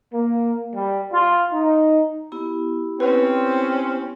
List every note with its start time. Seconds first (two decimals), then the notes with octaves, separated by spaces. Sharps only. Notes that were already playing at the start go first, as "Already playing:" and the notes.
0.13 A#3
0.75 G3
1.13 F4
1.53 D#4
2.32 B3 E4 G4
3.00 C4 C#4 B4